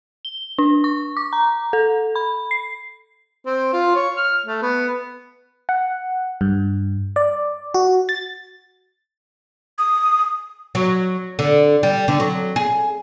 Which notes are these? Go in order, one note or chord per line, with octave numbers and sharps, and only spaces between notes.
G7
D4
C#6
D6
A#5
A4
B5
C7
C4
F4
C#5
F6
A3
B3
F#5
G2
D5
F#4
A6
D#6
F#3
D3
G3
D3
F#3
G#4